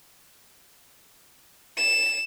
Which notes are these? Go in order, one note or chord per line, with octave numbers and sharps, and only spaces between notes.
E7